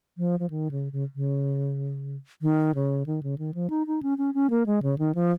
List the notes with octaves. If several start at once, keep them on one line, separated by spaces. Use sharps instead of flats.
F3
F3
D#3
C#3
C#3
C#3
D#3
C#3
D#3
C#3
D#3
F3
D#4
D#4
C#4
C#4
C#4
A#3
G#3
C#3
D#3
F3